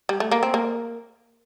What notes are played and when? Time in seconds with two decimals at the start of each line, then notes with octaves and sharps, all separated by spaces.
0.09 G3
0.20 A3
0.32 A#3
0.43 C4
0.54 A#3